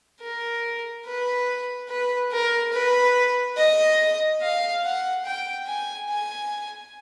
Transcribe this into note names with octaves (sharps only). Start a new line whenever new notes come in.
A#4
B4
B4
A#4
B4
D#5
F5
F#5
G5
G#5
G#5